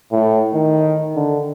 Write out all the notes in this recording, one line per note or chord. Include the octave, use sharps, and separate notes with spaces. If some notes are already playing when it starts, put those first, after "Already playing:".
A2
D#3
D3